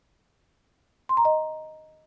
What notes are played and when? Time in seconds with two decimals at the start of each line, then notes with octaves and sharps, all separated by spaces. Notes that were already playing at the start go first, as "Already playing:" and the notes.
1.09 C6
1.17 A#5
1.25 D#5